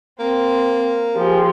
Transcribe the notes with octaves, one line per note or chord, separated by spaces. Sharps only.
A#3 C4
F3 G4 G#4